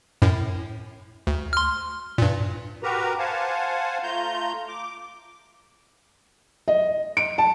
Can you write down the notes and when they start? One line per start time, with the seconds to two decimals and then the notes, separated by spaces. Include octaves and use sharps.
0.22 F#2 A2
1.27 D2
1.53 C6 F6
2.18 G2 A#2
2.83 F#4 G4 A#4 B4 A#5
3.19 C5 F5 F#5 G#5 A5
4.03 A3 F4 A#5 G6
4.68 D6
6.68 D#5
7.17 D7
7.38 A5